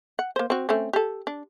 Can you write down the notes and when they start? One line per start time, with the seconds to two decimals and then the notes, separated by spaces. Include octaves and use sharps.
0.19 F#5
0.36 A#3 C5
0.50 C4 F#4
0.69 A3 C4 C#4
0.93 G4 A4
1.27 D4